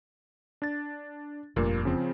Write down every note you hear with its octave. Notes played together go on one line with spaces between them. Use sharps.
D4 A6
F1 G2 A#2 A#3
C#3 F3 C4